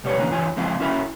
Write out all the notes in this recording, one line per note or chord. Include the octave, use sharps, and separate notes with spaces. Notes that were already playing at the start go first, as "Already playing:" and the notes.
B1 G3 B3 C#5
D3 E3 A#3 C#4
G2 E3 F4 C#5 G#5
C#2 F3 G#3 C4 E4 F4
C#4 E4 F#4 A#4 E5 B5